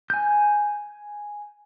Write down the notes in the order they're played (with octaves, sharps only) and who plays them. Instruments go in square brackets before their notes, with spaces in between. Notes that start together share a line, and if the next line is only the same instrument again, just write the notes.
[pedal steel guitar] G#5 G6